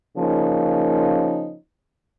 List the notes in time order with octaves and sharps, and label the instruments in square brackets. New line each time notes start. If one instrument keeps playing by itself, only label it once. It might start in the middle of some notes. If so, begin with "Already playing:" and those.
[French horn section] C#3 F3 A#3 C#4 D#4